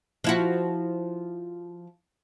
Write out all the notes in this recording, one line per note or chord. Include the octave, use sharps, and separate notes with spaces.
F3 E4 F#4